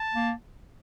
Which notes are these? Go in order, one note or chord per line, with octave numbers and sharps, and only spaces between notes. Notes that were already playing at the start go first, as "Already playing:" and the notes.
Already playing: A5
A#3